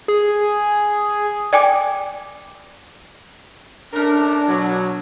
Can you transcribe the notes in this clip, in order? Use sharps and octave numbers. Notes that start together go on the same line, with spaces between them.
G#4
D5 G5 G#5 D6
A3 C#4 D4 A#4
B2 F#3